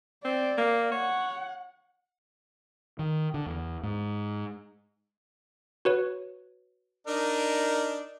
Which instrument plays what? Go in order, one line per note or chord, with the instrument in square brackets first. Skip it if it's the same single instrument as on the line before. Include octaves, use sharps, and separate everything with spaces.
[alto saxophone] C4 [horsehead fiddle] D5
[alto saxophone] A#3
[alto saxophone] C#5 [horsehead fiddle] F#5
[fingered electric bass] D#3
D3
E2
G#2
[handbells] F#4 B4 C#5
[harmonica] D4 D#4 A#4